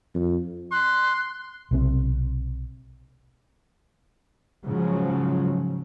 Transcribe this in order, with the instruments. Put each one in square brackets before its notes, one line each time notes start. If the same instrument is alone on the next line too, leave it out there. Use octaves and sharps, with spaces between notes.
[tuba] F2
[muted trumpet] C6 [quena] F#6
[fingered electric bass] B1 C3 C4
[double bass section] G#2 C#3 F3 F#3